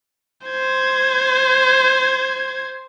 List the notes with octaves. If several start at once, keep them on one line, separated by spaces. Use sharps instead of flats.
C5 G#6